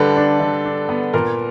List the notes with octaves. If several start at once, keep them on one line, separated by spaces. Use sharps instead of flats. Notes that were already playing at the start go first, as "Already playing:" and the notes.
Already playing: D3 G3 A4 B4
D4
D3
D4
B3
A#2 A#4